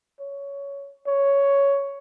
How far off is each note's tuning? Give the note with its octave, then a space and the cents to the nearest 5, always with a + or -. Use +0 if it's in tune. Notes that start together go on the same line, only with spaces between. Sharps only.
C#5 +15
C#5 +5